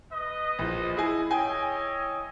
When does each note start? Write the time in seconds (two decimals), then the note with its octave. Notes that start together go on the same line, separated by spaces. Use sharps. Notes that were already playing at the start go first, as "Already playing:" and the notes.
0.12 B4 D#5
0.59 A#1 F3
0.97 E4 G#4 G#5
1.31 E4 C#5 D#5 G5 G#5